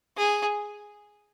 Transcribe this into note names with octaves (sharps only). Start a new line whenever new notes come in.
G#4